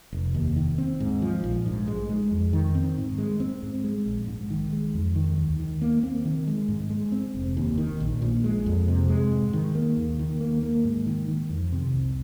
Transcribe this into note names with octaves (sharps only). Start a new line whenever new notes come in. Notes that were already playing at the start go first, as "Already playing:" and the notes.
F1
D#2
D#3
C4
G#2
F3
A#1
G#2
G#3
G#3
F2
D#3
C4
G#2
G#3
C4
G#2
G#3
A#1
G#2
D#3
G#3
F2
D#3
D#2
D#3
A#3
C4
D#3
G#3
G#2
G#3
C4
F1
D#2
D#3
A#1
A#2
G#3
F2
C3
G#3
G#2
D#3
A#3
D#2
D#3
A#3
A#3
G#2
D#3
D#3
F2
C3
C2